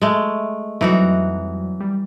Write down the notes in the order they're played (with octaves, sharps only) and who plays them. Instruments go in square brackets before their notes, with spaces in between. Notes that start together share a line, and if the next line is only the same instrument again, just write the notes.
[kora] G#3 A3
[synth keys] F2 F#3 G3 [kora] E3 D#4 F#4
[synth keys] G3